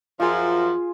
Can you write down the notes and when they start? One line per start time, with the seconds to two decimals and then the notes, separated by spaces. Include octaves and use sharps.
0.20 F#2 F3 F4 G#4